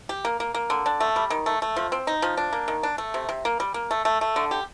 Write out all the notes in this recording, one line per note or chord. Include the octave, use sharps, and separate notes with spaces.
G4
A#3
A#3
A#3
D3
D4
A3
G3
D#3
A3
A3
F3
C4
D#4
F3
D4
A#3
D#3
D4
A3
C3
C3
A#3
G3
A#3
A3
A3
A3
D3
G4